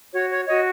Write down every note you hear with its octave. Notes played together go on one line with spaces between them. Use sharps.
F#4 C#5
C#5
F#4 C#5 D#5